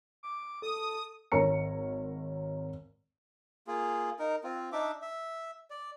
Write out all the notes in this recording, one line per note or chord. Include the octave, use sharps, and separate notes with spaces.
D6
A4 D#6
G#1 A#4 C#5 A#5 C#7
A#3 F4 G#4
D#4 A#4
C4 F4
D4 D#4 E5 D6
E5
D5